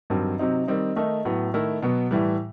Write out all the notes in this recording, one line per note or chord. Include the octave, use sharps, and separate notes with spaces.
G2 D#3 F#3 C4
C3 F#3 C4 D#4
D#3 G3 C4 D#4
D#3 A3 D#4
A2 F#3 B3
D#3 A3 E4
B2 F#3 B3
A2 E3 G3